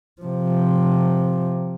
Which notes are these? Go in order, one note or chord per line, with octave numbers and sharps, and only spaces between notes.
C3 F3